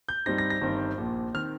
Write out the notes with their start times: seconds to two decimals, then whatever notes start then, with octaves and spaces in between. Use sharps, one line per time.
0.09 G6
0.26 G2 G3 C4 D#4 A#6
0.38 A#6
0.50 A#6
0.61 G1 G2 D#3 C4 D#4
0.98 A#1 A#2 F3
1.34 D#3 C4 F6